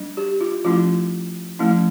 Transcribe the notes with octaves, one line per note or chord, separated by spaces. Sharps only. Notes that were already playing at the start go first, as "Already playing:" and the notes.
Already playing: G3 D4
G4
F4
F3 A3 C#4 E4 F4
F3 A3 C#4 E4